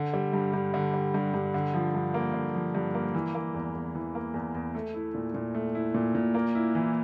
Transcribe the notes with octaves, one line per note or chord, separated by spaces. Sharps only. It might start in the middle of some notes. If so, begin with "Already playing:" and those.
Already playing: D3
G3
G2
G2
D3
G3
G2
G2
D3
F3
G2
A#3
D3
F3
G2
A#3
E3
A#3
E2
E2
E3
A#3
E2
E2
A3
E4
A#2
A#2
A3
E4
A#2
A#2
A#3
E4
E3